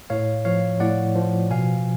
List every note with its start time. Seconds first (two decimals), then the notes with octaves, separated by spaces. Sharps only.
0.10 A2 C#5 F5
0.45 F3 C#5 F5
0.80 A2 D5 F#5
1.16 F3
1.50 B2 F5 G#5